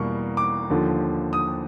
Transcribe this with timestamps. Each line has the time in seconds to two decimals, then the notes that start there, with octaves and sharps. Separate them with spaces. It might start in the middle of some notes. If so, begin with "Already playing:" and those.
Already playing: E2 B2 G3 A#3 C#6
0.37 D6
0.70 D#2 D3 F3
1.33 D#6